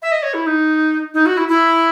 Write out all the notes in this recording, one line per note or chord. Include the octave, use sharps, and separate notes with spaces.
E5
D#5
C#5
E4
D#4
D#4
F#4
E4
E4